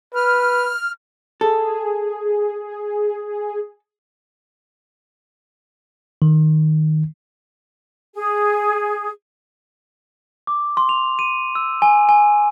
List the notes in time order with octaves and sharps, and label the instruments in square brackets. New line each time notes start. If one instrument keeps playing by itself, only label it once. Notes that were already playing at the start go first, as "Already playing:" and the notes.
[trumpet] B4 [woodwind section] F6
[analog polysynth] G#4 [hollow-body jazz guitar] A4
[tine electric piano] D#3
[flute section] G#4
[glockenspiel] D6
C6
F7
D#7
E6
G#5
G#5